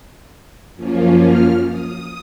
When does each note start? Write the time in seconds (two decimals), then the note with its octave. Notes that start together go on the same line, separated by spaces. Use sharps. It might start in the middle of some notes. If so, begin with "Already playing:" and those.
0.75 F#2 F3 A#3 C#4 F4
1.22 F6
1.68 D#6